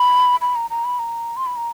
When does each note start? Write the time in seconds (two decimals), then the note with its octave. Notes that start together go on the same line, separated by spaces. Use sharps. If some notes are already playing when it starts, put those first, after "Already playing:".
Already playing: B5
0.42 B5
0.56 A#5
0.70 A#5
0.85 B5
0.99 A#5
1.37 C6
1.46 B5
1.56 A#5